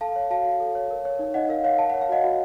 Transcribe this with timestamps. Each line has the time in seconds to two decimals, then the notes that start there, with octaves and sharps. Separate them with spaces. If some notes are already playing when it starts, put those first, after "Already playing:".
0.01 A4 F5 A5
0.16 C#5
0.30 F#4 F5 A5
0.45 F#4
0.60 A4
0.75 C#5
0.91 A#4
1.05 C#5
1.19 D#4
1.34 D#4 D#5 F#5
1.49 A#4 F5
1.64 C#5 F5
1.78 A#4 A5
1.90 C#5 F#5
2.01 F5
2.09 F#4 D#5 F#5
2.24 F#4